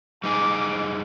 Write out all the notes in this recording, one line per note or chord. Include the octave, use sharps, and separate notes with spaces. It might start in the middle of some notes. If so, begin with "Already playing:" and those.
G3 D#4 G#4 D6